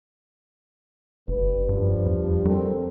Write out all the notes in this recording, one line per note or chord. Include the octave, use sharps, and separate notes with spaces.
F#1 G2 B4
G2 F3 G3 D4
F2
G3 C4 A4 A#4